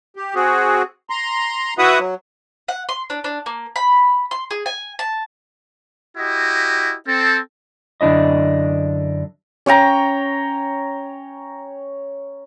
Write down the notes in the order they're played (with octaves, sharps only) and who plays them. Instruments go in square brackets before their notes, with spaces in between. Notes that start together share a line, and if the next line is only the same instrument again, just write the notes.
[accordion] G4
C4 F#4 G#4
A#5 C6
E4 F#4 B4 E5 F#5 D#6
F#3
[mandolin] F#5
C6
D4
D4
A#3
B5
C6
G#4
G#5
A5
[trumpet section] E4 F#4 G4 D#5
C4 A4
[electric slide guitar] F#2 D3 D4 E4 D#5
[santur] C#4 C#5 G5 A#5